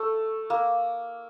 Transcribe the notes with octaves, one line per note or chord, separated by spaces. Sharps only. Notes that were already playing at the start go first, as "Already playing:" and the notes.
Already playing: A3
A#3